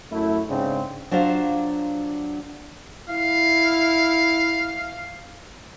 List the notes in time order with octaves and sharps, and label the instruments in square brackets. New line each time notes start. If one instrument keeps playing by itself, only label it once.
[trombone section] F#2 A3 E4
G#2 C#3 C4 D4
[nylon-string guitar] F#3 D4 F4 C5 F5
[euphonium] E4 [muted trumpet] F5